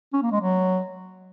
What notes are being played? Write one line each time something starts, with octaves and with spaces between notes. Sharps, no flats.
C#4
A#3
G#3
F#3